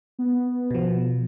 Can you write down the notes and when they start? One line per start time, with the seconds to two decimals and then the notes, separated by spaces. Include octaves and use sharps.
0.19 B3
0.71 B2 F3